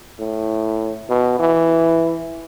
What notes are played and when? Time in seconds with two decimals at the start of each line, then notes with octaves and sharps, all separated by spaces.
0.20 A2
1.09 B2
1.39 E3